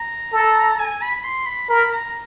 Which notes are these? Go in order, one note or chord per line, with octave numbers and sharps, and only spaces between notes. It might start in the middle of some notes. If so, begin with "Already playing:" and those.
Already playing: A#5
A4
G#5
B5
C6
B5
A#4 B5
A#5